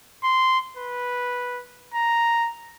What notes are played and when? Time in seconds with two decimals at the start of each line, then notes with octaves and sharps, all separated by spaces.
0.24 C6
0.77 B4
1.94 A#5